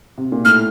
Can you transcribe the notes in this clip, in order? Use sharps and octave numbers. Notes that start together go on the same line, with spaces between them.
C3
A#2
A2 F6